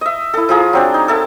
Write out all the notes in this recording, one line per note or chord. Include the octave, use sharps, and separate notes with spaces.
D#5 E5
E4 A4
F3 F4 G#4 A#5
F#3 C4 D4
D#4
A4 A#4 E5 A5